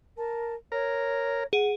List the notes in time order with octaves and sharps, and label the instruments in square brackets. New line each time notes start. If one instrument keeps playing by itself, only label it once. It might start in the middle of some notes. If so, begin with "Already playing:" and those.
[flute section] A#4 A5
[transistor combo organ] A#4 [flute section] C#5
[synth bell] G#4 [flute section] F#5